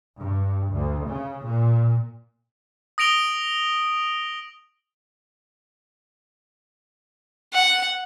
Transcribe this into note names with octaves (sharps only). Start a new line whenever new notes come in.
G2
D2
C#3
A#2
D#6 A#6 D7 F7 G7
F#5